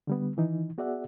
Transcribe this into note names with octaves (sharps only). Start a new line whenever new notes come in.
D3 G3 B3
D#3 E3 D#4
B3 F#4 G#4 D5 E5 F#5